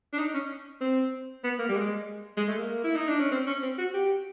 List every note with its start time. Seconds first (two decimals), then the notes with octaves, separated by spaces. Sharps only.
0.13 D4
0.18 D#4
0.34 C#4
0.81 C4
1.44 B3
1.59 A#3
1.69 G3
1.75 G#3
2.37 G#3
2.48 A3
2.58 A#3
2.84 E4
2.96 D#4
3.08 D4
3.20 C#4
3.31 C4
3.47 C#4
3.62 C4
3.78 F#4
3.94 G4